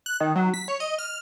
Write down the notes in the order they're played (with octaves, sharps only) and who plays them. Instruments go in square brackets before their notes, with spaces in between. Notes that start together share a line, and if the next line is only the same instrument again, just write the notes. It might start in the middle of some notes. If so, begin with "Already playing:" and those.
[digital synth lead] F#6
D#3
F#3
B6
C#5
D#5
F6